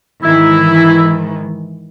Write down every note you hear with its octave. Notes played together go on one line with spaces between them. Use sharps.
G#2 D#3 E3 E4